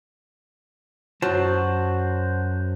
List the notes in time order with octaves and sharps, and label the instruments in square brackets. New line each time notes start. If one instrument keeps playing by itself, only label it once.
[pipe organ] F#2 [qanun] F#3 [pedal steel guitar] F#4 C5 A5